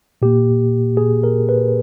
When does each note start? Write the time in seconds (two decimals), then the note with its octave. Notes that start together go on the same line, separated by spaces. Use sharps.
0.22 A#2 A#3 G4
0.97 A#2 A#3 G#4
1.24 A#4
1.49 B4